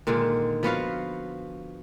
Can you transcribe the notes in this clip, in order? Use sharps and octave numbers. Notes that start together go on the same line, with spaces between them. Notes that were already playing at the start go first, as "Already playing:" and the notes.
A#2 D3 D#3 G#3
F3 B3 F#4 F5